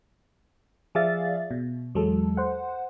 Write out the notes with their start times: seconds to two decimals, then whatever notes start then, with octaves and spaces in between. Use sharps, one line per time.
0.95 F3 G#4 D5 E5 F5 A6
1.51 B2
1.95 E2 F#3 G#3 A4
2.37 C5 F#5